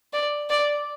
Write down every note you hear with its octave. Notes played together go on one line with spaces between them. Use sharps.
D5
D5